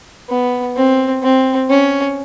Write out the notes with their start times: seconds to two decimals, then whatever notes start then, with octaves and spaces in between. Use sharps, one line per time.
0.29 B3
0.76 C4
1.23 C4
1.70 C#4